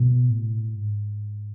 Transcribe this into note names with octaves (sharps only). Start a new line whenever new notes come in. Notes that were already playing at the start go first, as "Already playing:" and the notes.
Already playing: B2
A2
G#2